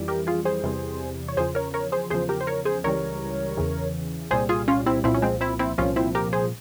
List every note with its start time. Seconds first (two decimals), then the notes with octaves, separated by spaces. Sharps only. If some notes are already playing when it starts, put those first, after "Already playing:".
Already playing: F2 E3 G3
0.08 G4 A#4
0.27 F4 G#4
0.45 G#4 C5
0.64 E2 C3 E3 G3
1.28 C#5
1.37 E2 C#3 F3 G#4 C5
1.55 A#4 C#5
1.74 A#4 C#5
1.92 G#4 C5
2.10 E2 C#3 F3 G#4 C5
2.29 G4 A#4
2.41 C5
2.47 A#4 C#5
2.65 G#4 C5
2.84 C#2 C#3 E3 G3 A#4 C#5
3.57 E2 C#3 E3
4.31 C2 A#2 G3 G#4 C5
4.49 F4 G#4
4.68 C#4 F4
4.86 C4 E4
5.04 C2 A#2 F3 C4 E4
5.14 C#4
5.22 G#3 C4
5.41 C4 E4
5.59 C4 E4
5.78 C2 A#2 F3 C#4 F4
5.96 C4 E4
6.15 G4 A#4
6.33 G#4 C5